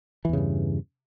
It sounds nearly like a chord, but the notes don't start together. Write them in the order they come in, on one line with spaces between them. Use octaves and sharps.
E3 E2 C#3 G2